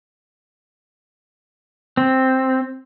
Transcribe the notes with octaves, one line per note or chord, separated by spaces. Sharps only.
C4